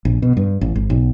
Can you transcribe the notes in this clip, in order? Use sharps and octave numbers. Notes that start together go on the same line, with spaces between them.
A#1
B2
G2
A1
G#1
B1